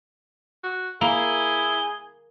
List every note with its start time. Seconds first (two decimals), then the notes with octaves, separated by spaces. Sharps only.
0.63 F#4
1.01 A#3 E4 G#4 G6